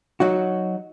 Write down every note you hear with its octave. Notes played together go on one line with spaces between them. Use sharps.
F#3 D#4 F#4